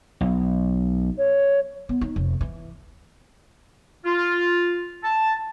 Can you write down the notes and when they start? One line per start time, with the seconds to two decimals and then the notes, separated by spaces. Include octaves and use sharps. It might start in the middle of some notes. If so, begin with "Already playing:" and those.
0.21 B1
1.18 C#5
1.89 B3
2.01 D#4
2.16 F1
2.41 E3
4.06 F4
5.05 A5